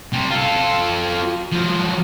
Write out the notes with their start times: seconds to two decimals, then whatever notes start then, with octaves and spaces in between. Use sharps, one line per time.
0.13 C3 G3
0.30 F4 A4
1.52 F3 F#3